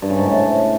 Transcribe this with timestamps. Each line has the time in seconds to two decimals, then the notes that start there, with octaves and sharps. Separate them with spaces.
0.02 G2
0.10 C#3
0.18 G#2
0.26 A2